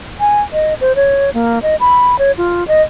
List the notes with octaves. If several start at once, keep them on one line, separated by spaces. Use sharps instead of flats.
G#5
D#5
C5
C#5
A#3
D#5
B5
C#5
F4
D#5